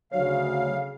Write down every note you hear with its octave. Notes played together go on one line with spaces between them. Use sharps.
D2 C#3 F#3 C#5 F5